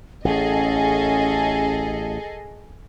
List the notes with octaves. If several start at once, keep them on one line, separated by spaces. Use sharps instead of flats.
A1 C#4 G#4 A4 D#5